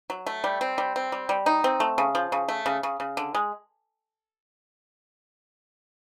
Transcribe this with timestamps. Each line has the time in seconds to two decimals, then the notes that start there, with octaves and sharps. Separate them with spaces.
0.10 F#3
0.26 A3
0.44 G3
0.61 C4
0.78 G3
0.96 C4
1.12 G3
1.29 G3
1.46 D#4
1.64 C4
1.80 A3
1.98 C#3
2.15 F3
2.32 C#3
2.48 A3
2.66 C#3
2.83 C#3
3.00 C#3
3.17 D3
3.35 G#3